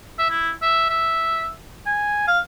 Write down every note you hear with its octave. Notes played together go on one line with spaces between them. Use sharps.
E5
E4
E5
E5
G#5
F5